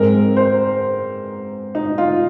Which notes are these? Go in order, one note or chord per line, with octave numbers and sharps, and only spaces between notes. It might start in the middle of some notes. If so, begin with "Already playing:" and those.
Already playing: G#2 G#3 C4 A#4
C5
D#4
F4